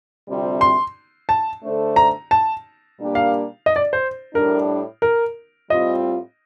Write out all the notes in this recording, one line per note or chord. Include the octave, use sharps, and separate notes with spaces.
D2 C3 G3 C4 F4
C6
A5
D3 A3 D4 A4 C5
A#5
A5
A#2 G3 A#3 D4 G4
F5
D#5
D5
C5
A2 G3 D4 A#4
A#4
A2 G3 C4 F4 D#5